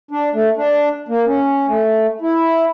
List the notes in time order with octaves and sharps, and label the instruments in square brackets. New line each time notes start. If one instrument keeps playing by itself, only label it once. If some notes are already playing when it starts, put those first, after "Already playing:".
[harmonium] D4
A3
D4
A#3
C#4
A3
E4